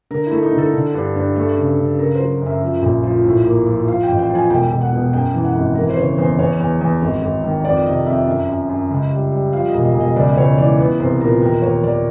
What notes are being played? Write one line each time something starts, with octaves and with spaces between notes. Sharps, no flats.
D3 A#4
A3 E4
D#4
D3
A4
D3
G2
G2
A3
C#3
C#3
C#3 A#4
F#3 C5
F#2 E5
F3
A#1
F3
A2
A#3
F3
F3 F5
G5
A1
G5
F3
G#5
E1 G5
E1
F#5
B2
F#2 G5
E3
F#5
G#1
E3 A#4
B4
C5
C#3 C#5
E2 C5
E2 C#5
E2
E2
G#1
G#1
D#3
F2 D5
C3 D#5
F2 E5
F#2
F#2
F#2
C#2
G3
G3
F3 F5
D#5
E1
D#5
E1
D#5
C#2 D5
C#2 C#5
E3 D5
B3
C2 C5
A#2 A#4
D#2 A#4
D#2 C#5
D#2 D5